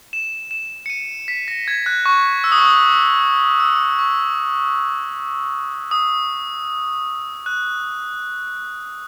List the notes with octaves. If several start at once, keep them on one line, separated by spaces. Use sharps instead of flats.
E7
E7
C#7
D#7
B6
A#6
G#6
F#6
C#6
E6
D#6
C#6
D#6
E6
C#6
D#6
F#6